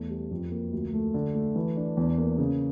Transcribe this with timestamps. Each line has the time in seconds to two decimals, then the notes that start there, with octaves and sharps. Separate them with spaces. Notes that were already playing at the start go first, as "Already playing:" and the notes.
Already playing: E2 A3
0.10 G3
0.31 F2
0.52 A#3
0.72 D2
0.93 A3
1.14 D3
1.35 A3
1.56 E3
1.77 D4
1.97 E2
2.18 A#3
2.38 C#3